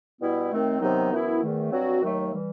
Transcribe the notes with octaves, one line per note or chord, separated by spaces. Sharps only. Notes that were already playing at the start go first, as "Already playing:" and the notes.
B2 G3 B3 E4
D#2 D#3 A3 C4
C3 D#3 F#3 B3 D#4
F#2 E3 B3 E4
E2 D#3 A3
G2 F#3 C4 F#4
D#2 D#3 F#3 A3
E3 G3